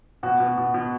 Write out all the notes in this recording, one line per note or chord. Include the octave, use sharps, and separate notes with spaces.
B2 F#4
B2
B2
B2